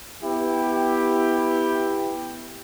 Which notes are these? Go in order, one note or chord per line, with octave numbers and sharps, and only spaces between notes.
B3 E4 G4